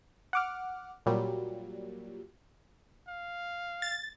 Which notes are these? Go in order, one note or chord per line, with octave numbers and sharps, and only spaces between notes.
F#5 D6 F6
A#2 F#3 G3
F5
A6